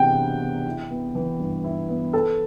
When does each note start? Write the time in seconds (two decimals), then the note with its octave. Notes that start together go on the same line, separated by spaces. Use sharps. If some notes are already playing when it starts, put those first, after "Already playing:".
Already playing: C3 E3 B3 D4 F#5 G5
0.17 D4
0.41 B3
0.66 E4
0.91 B3
1.15 E3
1.40 G2
1.64 E4
1.89 B3
2.13 A4 B4